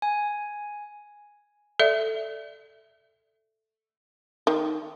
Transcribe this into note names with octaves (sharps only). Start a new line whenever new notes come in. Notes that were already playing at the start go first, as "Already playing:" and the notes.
G#5
A4 D5 E5
D#3